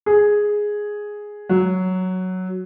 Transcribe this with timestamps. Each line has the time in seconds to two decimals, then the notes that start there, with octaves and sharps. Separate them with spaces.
0.06 G#4
1.49 F#3